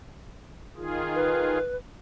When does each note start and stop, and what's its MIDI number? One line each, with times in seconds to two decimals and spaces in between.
0.76 1.58 51
0.76 1.58 65
0.76 1.58 68
1.16 1.76 71